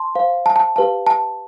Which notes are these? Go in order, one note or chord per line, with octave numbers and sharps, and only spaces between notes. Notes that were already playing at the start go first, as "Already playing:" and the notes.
Already playing: A5 C6
C5 F5
A5
A5
G4 B4 F5 A5
A5